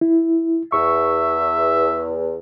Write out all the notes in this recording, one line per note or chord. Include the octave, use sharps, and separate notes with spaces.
E4
E2 E5 C#6